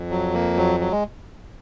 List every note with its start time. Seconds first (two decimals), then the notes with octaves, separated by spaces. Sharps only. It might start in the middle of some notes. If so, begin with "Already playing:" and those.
Already playing: F2
0.10 F#3
0.34 A#3
0.57 F#3
0.80 F#3
0.91 G#3